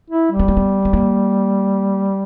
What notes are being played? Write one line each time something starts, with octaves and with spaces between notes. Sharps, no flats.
E4
G3
B3
A#3
B3
B3
A#3